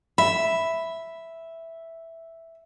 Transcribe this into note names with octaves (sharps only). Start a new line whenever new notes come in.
E5 B5